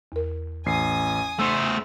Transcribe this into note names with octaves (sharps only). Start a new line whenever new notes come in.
E2 A#4
A1 G#5 D#6 C7
A3 C5 E6